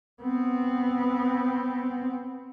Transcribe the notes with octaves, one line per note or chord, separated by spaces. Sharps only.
B3 C4